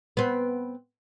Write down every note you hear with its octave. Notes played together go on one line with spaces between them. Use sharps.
B3 C4